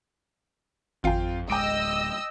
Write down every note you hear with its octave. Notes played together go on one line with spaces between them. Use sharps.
G#1 F2 C4 F4 F5 G5
D1 G#3 D#5 G5 D6 E6 D7